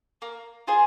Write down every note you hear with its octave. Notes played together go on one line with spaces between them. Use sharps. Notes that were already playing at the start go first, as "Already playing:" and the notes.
A#3
F4 G#4 C5